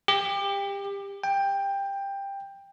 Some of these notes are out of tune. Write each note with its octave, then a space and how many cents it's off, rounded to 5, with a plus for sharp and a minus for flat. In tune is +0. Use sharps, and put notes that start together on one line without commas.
G4 +25
G5 +15